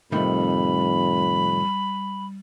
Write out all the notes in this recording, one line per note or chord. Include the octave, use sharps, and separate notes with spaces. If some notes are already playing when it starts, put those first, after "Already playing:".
F2 A2 C3 D#3 G3 B5